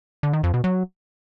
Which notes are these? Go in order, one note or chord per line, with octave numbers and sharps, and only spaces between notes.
D3
D#3
F2
B2
F#3